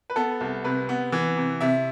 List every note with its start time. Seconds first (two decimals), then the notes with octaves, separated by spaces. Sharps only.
0.10 B4
0.16 B3 A4
0.41 C2
0.64 C3 B4
0.89 B3
1.12 E3
1.37 C3
1.61 C3 E5